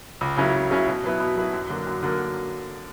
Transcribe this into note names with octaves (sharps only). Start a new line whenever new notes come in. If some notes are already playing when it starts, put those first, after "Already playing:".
C#2
C#3 F#3 C#4 E4
C#2
C#3 F#3 C#4 E4
B2
F#3 B3 E4
B2
F#3 B3 E4
F#2
D3 F#3 A#3
F#2
D3 F#3 A#3